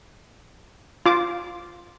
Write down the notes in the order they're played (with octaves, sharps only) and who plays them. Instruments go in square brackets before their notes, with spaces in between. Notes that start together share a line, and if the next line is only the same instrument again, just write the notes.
[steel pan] F4 D6